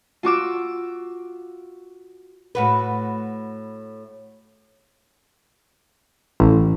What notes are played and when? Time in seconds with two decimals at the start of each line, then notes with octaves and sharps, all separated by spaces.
0.23 F4 F#4 D6 E6
2.55 A2 F#4 B4
6.40 A1